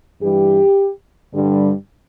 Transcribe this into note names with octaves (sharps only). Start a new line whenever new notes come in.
G2 E3 G3 G4
G2 D3 G3